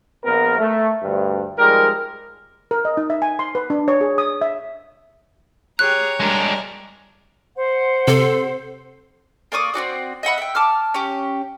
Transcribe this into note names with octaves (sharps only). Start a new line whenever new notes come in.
A#1 A#2 B3 A#4
A3
D2 G2
F3 G3 G#3 D#4 G4 A#4
A#4
D#5
D#4
E5
G#5
C6
B4
D4
C#5
G#4
D#6
E5
G4 G#4 C#5 A#5 F#6
G3 G#3 D4 A#4
C5 F#5
C3 A4
A#3 D5 C#6 D#6
C4 D4 F#4 D5
D#5 E5 F#5 B5
E5 G5
A5 D6 F6
C#4 G4